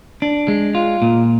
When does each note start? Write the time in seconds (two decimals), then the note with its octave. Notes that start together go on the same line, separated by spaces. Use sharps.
0.22 D4
0.48 G#3
0.75 F4
1.02 A#2